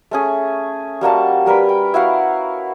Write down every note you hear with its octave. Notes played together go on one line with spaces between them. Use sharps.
A3 C#4 G#4
G3 A#3 F#4 A5
G3 A#4 B4 B5
G5
E4 F#4 F5 F#5